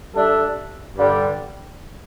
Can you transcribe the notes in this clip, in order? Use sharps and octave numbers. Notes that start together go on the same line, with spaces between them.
G3 D4 A4 E5
G2 D3 G3